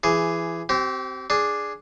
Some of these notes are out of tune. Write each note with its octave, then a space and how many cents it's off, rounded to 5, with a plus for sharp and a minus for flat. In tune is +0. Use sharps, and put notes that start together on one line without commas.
E3 +25 G#4 +0
C4 +0 G4 -35
D4 +0 G#4 +0